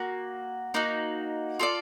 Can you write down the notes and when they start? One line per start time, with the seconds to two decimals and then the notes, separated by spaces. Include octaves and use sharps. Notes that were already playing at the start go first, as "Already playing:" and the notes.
Already playing: A#3 F#4
0.74 A#3 D#4 F#4
1.59 F4 A4 D5